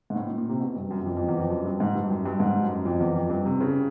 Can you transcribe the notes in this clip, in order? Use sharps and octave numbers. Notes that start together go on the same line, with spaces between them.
G#2
A2
A#2
A#2
C3
B2
G2
F#2
F#2
F2
F2
E2
F2
F#2
G2
G#2
G2
F#2
G2
G#2
F#2
F2
E2
F2
G2
C3
C#3